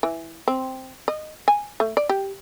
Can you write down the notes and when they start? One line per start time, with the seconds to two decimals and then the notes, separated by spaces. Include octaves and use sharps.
0.03 E3
0.48 C4
1.08 D#5
1.48 G#5
1.80 A3
1.97 D5
2.09 G4